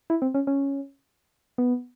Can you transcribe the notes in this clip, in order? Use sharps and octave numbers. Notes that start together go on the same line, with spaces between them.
E4
C4
C#4
C#4
B3